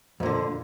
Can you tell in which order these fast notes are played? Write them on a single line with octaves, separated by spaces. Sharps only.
F2 A#2 D3